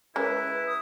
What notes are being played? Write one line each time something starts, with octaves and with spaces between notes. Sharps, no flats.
G#3 C#4 E4 A#4 B4
B4
D#6